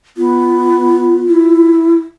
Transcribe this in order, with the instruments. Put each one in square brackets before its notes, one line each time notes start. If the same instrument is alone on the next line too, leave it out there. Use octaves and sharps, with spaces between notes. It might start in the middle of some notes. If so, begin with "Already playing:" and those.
[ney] B3 [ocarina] F4
[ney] E4